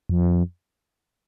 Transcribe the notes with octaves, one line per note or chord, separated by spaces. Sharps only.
F2